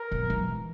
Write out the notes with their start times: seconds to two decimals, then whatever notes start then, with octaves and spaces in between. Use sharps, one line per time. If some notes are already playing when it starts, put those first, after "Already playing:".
Already playing: A#4
0.11 B2
0.30 E3